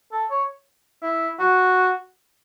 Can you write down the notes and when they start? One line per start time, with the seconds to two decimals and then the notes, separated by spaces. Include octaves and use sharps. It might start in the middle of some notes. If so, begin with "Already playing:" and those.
0.12 A4
0.30 C#5
1.03 E4
1.39 F#4